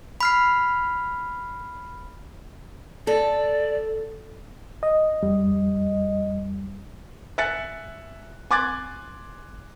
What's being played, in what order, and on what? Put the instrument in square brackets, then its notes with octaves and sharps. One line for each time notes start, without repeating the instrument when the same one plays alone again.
[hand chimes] B5 F6 C7
[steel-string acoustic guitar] A4 [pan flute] D5
[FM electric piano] D#5
[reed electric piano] F2 G3
[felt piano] E5 G#5 F#6 A6 C#7
G#5 C6 D6 F#6 G#6 A6